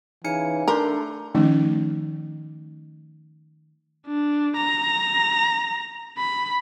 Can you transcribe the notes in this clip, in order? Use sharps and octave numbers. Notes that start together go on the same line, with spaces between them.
C#3 E3 D#4 G#5 C#7
A3 D4 A4 A#4 C6 G6
D#3 F3 A3 C#4 D#4
D4
A#5
B5